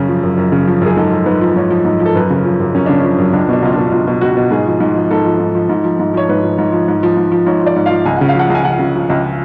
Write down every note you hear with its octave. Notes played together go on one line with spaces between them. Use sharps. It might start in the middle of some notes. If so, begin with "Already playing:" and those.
Already playing: F#2 C#3
F3
F#2
F#2
C#3
F3
F#2 G#4
G#2 A4
F3
G#2 B4
F3
G#2 C#5
F3
G#2
F3
A4
F#2 B4
C#3
F3
F#2
F#2 C#4
C#3 D4
C#4
F3
F#2
C#4
C#2 D4
B2 D4
C#2 F4
B2 D4
C#2 F4
B2
C#2 F#4
B2
G#2 G#4
F3
G#2
F3
G#2 A4
F3
G#2
F3
G#2
F3
G#2
F3 C#5
G#2 B4
F3
G#2
F3
G#2
F3
G#2
F3
G#2 C#5
F3 D5
G#2
F5
F3
C#2 G#5
C#3 F#5
F5
F3 F#5
C#2 G#5
C#2 F#5
C#3
F3
C#2